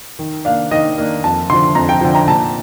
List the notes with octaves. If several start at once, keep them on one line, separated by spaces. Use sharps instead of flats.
D#3
A#3 D4 F5
D#3 D#5
A#3 D4
F2 A5
D3 F3 C6
F2 A#5
G5
D3 F3 G5
A#5
A#2 A5